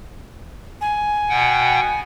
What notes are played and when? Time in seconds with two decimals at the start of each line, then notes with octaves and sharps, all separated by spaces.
0.81 G#5
1.29 B2 F#5 G5